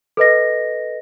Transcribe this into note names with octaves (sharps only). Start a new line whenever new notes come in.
A4 B4 D#5 A#6